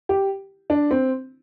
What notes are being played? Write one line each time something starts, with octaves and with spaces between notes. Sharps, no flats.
G4
D4
C4